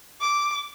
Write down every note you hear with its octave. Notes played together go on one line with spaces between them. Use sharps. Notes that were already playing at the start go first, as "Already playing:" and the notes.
D6